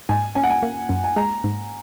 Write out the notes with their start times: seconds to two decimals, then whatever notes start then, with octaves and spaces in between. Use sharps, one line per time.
0.09 G#2 G#5
0.35 C#4 G#5
0.44 F#5
0.50 G#5
0.63 A#3
0.89 F#2
1.04 G#5
1.16 G#3 A#5
1.44 G#2